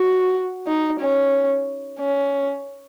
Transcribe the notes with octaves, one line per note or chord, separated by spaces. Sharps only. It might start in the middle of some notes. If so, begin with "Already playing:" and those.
Already playing: F#4
D#4
C#4
C#4